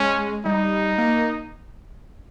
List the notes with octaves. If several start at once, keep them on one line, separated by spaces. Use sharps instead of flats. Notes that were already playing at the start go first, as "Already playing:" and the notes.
Already playing: G#3 C#4
G3 D#4
A#3